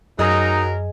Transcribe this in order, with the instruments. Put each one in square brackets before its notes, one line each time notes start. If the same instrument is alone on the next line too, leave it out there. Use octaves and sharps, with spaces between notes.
[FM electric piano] F#2 [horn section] F#3 A#4 [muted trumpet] D#4 [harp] G#4 D#5